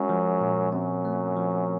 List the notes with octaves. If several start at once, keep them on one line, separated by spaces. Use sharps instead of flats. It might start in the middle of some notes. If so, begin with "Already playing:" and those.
Already playing: F#2 G#3 C#4
F3
A#2
F#2 C4
A3
F3